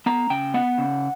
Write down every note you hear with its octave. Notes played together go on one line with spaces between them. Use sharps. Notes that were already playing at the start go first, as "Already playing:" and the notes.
B3 A#5
C#3 G5
B3 F#5
C#3